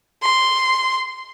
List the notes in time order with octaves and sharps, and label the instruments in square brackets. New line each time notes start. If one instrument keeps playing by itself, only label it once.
[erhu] C6